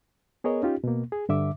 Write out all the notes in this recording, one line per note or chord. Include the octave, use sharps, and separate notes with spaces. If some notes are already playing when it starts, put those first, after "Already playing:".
B3 G#4 A#4 C#5 D#5
C#4 D#4 F4 G4
B2 A#3
G#4
G2 D3 E5 D6